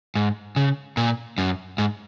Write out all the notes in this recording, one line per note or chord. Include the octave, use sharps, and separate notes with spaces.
G#2
C#3
A#2
F#2
G#2